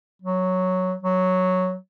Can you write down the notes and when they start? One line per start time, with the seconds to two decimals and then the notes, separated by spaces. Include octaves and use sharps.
0.22 F#3
1.03 F#3